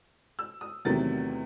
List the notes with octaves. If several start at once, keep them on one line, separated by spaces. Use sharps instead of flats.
E6
D#6
E2 C3 D#3 F#3 A3 A6